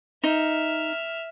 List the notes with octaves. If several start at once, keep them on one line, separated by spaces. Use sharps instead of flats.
D#4 E5 F6